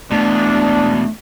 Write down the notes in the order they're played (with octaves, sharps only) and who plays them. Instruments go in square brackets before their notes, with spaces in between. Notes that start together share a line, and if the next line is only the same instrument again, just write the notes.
[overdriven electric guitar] E2 B2 [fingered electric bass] A3 [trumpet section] D4